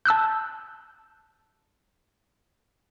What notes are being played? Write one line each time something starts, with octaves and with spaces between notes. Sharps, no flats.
A5 E6 F#6 G6